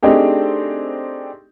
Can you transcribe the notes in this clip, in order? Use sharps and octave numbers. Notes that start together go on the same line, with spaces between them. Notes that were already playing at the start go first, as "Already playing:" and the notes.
A3 C4 D4 D#4 G4 G#4